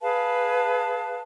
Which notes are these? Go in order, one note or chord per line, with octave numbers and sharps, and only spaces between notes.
G#4 B4 F5 A5